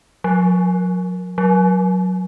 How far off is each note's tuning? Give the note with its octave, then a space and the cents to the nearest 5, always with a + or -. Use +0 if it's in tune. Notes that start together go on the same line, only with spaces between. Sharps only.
F#3 -40
F#3 -10